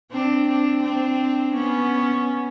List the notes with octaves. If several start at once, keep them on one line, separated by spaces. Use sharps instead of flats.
C4 D4
C4 D4
C4 D4
B3 C#4